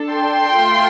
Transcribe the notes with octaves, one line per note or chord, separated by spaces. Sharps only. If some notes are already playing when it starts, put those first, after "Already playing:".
Already playing: D4 A4
G5 C6
A3 F4 A4